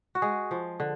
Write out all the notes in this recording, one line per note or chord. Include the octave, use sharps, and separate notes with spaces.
F#4
G#3 G#4
F3
D3